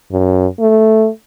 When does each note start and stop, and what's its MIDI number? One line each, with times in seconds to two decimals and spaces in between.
0.12 0.47 42
0.60 1.09 57